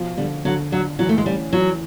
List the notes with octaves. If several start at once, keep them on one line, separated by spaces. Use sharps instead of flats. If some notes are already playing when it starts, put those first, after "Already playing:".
Already playing: B2 F3
D3 G3
D3 F#3
F#3 D4
E3 F#3
A3
G#3
G3 C#4
E3 F#3